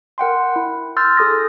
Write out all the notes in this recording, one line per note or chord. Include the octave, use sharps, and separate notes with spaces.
A#4 F#5 G5 C6
E4
C6 E6 F6 G6 A6
G#4 A4 D#6 A#6